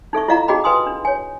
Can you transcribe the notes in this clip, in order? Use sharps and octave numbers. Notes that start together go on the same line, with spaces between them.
D#4 A4 E5 C#6
E4 F4 D#5 F5 F#5 A#5
D#4 F#4 G#4 D#5 G5 B5
B4 F5 G#5 C6 D#6
D4
C#5 G#5